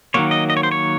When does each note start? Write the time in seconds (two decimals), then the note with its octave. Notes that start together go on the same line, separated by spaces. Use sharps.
0.14 D#3 F#3 A#3 C#5
0.31 D#5
0.50 D#5
0.57 C#5
0.63 C5
0.72 C#5